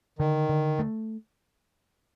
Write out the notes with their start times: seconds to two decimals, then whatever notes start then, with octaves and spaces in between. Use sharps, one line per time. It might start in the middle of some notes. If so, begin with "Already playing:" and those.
0.19 D3 D#3
0.49 D3
0.79 A3